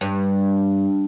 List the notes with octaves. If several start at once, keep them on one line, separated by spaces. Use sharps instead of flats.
G2